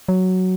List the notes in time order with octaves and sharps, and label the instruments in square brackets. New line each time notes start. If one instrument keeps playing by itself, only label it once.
[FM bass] F#3